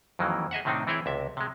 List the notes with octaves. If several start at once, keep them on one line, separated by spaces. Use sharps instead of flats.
F2 D#3 E3 F#3 A#3
G#4 D#5 E5 F#5
A2 C3 D#3 C4 D4 D#4
E3 C4 E4 G#4 C#5 G5
C#2 C3 E5
C3 G#3